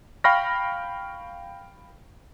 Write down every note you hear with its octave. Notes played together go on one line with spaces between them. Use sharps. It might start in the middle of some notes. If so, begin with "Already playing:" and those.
F5 G5 B5 C#6 F6 A#6